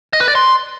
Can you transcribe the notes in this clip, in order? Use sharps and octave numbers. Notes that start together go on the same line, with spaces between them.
D#5
B4
D5
C6